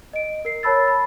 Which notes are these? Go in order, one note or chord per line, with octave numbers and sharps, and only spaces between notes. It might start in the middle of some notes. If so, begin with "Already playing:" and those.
D#5 D7
A#4 C7
A#4 C#5 A5 B5 E6 A6
B5